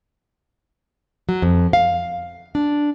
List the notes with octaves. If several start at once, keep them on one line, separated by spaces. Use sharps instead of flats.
F#3
F2
F5
D4